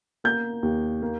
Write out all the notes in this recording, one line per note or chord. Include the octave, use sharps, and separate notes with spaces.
A#3 G6
D#2
A#3